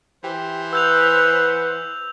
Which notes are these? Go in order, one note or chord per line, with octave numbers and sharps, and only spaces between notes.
E3 G4 C5
B4 F#5 E6 G6 F7